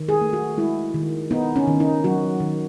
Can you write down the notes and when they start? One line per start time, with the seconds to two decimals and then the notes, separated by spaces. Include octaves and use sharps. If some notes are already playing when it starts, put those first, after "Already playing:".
Already playing: D#3
0.09 G#4
0.21 A3
0.33 F#4
0.57 G#3 E4
0.94 D#3
1.31 B3 D#4
1.56 C#4
1.67 D#3
1.80 D#4
2.04 F#3 F#4
2.40 D#3